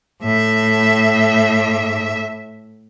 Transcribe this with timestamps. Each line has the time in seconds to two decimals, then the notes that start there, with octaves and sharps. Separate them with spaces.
0.23 A2 E5